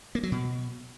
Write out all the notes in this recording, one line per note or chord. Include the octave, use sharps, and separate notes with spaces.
A#3
F#3
B2